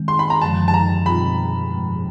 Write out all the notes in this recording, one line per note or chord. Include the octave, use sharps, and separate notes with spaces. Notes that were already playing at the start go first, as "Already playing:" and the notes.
Already playing: D#3 G#3 C4
C6
B5
A#5
F#2 D3 F3 G#3 A5
A5
A#5
B2 G3 C4 F4 B5
G#2 F3 G#3